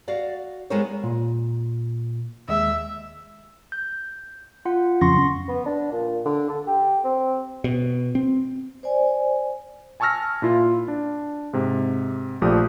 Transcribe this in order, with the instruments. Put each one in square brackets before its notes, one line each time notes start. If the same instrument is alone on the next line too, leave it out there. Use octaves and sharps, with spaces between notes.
[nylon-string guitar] F#4 D5 F5
G#3 B3 E4 A#4 C5 C#5
[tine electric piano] A#2
[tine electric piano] D#2 G#3 [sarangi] E5
[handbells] G6
F4 F#5
[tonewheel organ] F2 C#3 [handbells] C6 C#6 A#6
[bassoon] B3
D4
A#2
D3
A4
G4
C4
[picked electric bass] B2
C4
[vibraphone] C5 D5 G#5
[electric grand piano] G#5 A5 C#6 E6 F6 A#6
A#2 E4 F4
D4
G#2 C3
A#1 F3 A3 G4 D5 D#6